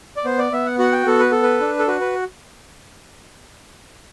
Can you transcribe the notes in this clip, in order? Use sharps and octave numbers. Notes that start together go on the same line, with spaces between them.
D5
B3 C5
D5
B3 E5
F#5
F#4 F#5
G5
B3 A4
B4
A4
B4
D4
A4
F#4 B4
B4